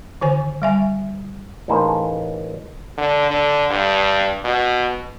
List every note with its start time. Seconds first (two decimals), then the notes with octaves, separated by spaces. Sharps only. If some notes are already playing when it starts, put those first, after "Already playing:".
0.21 D3 D#3 C5 G#5
0.62 G3 E5 G#5
1.68 A1 A2 A#3 D#4 G#4 C5
2.98 D3
3.31 D3
3.70 G2
4.44 B2